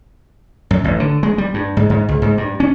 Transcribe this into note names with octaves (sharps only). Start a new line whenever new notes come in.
F#2
A1
D3
G#3
G3
G2
G#2
G#2
C#2
G#2
G2
C#4